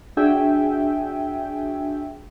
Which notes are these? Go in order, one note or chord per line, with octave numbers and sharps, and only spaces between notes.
D4 F#4 G#4 E5 G5 G#5